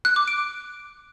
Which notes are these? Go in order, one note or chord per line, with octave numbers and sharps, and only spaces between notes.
F#6
D6
D7